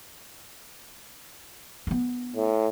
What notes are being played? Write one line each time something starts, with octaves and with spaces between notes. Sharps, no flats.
B3 D4
A2